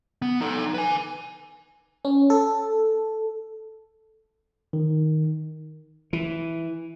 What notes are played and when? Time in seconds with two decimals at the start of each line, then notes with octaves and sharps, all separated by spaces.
0.22 B3
0.40 D#4 A4
0.74 B4 G#5
2.05 C#4
2.30 A4
4.73 D#3
6.13 E3